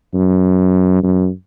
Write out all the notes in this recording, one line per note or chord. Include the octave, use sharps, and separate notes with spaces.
F#2
F#2